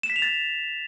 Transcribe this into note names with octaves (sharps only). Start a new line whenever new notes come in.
E7
B6
F7
A6